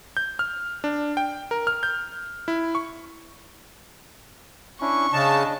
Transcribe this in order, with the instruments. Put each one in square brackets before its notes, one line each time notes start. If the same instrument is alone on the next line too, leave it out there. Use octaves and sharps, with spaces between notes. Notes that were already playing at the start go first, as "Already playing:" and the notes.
[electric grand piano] G6
F6
D4
G5
A#4
F6
G6
E4
C#6
[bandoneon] C#4 D4 E4 [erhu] C#6
[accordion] C#3 A5 [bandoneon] D4 D#5